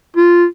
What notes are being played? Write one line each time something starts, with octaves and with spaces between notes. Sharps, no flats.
F4